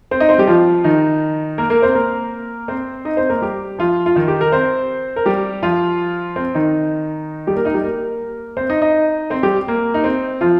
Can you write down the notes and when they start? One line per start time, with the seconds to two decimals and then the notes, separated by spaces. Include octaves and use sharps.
0.11 C4 C5
0.20 D#4 D#5
0.29 C4 C5
0.38 G3 G4
0.48 F3 F4
0.84 D#3 D#4
1.58 A#3 A#4
1.70 A#3 A#4
1.82 C4 C5
1.95 A#3 A#4
2.68 C4 C5
3.05 D#4 D#5
3.17 C4 C5
3.29 A#3 A#4
3.42 G3 G4
3.79 F3 F4
4.06 F4
4.15 D#3 D#4
4.28 G4
4.41 A#4
4.52 C4 C5
5.16 A#4
5.26 G3 G4
5.63 F3 F4
6.36 C4
6.55 D#3 D#4
7.47 G3 G4
7.56 A#3 A#4
7.65 D#4 D#5
7.74 G3 G4
7.84 A#3 A#4
8.57 C4 C5
8.70 D#4 D#5
8.82 D#4 D#5
9.30 C4 C5
9.43 G3 G4
9.68 A#3
9.94 D#4
10.04 C4
10.41 F3 F4